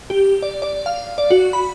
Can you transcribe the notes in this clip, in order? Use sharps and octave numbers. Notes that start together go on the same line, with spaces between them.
G4
D5
D5
F5
D5
F#4
B5